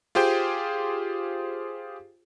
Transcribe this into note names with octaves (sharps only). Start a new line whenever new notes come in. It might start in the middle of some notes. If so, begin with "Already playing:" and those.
F4 G4 G#4 C5 G5